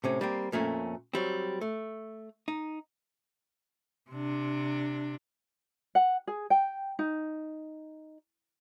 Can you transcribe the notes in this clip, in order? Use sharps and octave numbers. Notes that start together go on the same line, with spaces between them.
A2 C3 C#4
G3 A#3 C4
F2 A#2 A3 C#4
F#3 G3 C4
A3
D#4
C3 D4
F#5
G#4
G5
D#4